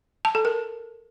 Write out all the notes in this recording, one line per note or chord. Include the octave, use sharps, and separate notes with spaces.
A5
A4
A#4